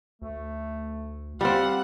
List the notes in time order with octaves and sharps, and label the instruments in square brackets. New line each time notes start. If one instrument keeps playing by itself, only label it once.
[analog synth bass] D2 [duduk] A3
[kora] G3 C4 [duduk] F4 [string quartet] F#5